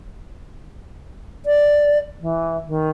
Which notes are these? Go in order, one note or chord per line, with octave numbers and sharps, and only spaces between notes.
D5
E3
D#3